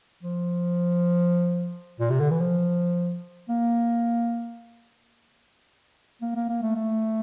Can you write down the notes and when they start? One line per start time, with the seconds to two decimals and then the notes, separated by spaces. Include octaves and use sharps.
0.23 F3
2.00 A#2
2.10 C3
2.20 D3
2.30 E3
2.41 F3
3.49 A#3
6.22 A#3
6.35 A#3
6.49 A#3
6.62 A3
6.76 A3